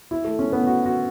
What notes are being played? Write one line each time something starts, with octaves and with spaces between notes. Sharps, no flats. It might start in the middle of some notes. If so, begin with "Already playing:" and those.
E4
A3
C#4
B3
F#4
F#4